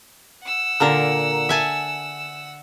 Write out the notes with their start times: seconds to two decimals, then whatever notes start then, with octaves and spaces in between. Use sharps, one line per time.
0.43 F#5 E6
0.80 A#2 D3 A#4
1.49 E5 G#5 A5